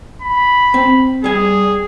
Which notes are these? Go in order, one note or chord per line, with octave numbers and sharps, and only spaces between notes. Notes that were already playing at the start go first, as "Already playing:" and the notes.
B5
C4
G3 G#4 G#5